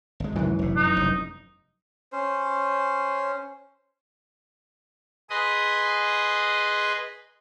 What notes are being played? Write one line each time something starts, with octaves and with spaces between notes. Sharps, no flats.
G#1 G#3
C2 F#2 D#3 E3 G#3
F1 A2
D#4
F1 G2
C#4 C5
G#4 B4 D#5 C6 D#6